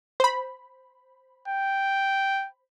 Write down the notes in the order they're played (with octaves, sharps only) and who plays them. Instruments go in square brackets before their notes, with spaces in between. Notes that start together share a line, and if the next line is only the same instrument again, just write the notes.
[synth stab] C5 B5
[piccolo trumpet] G5